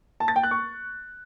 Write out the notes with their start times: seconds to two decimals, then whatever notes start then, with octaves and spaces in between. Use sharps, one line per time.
0.20 A5
0.28 A6
0.36 G5
0.43 F#6
0.51 C#6